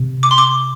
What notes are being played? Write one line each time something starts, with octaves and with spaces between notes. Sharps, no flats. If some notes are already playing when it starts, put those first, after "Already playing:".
Already playing: C3
D6
C6
D6